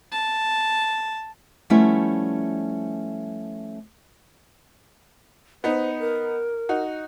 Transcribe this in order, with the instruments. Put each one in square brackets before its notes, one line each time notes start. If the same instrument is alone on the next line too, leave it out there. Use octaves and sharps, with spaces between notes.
[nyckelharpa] A5
[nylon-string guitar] F3 G3 A3 B3 C#4 E4
[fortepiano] B3 D#4 [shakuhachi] C5
[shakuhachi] A#4
[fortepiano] D#4 F#4